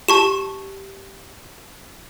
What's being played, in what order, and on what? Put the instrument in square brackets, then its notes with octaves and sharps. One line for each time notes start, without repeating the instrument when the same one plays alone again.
[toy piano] G4 [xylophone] A5 C#6 E7